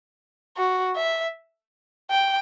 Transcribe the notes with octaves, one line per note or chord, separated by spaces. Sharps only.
F#4
E5
G5